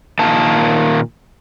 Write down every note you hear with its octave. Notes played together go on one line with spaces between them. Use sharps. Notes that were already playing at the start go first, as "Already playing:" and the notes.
A#2 D#3 A#3 A5